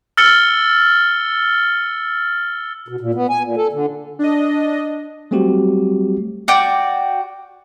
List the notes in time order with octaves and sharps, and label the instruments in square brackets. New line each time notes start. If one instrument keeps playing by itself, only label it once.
[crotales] E6 F6 A6 C#7 G7
[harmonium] B2
A#2
B3
G#5
A#2
A4
D3
[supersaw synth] D4 D#5
[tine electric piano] F#3 G3 A3 C4 F#4 G4
[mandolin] F#4 D5 G5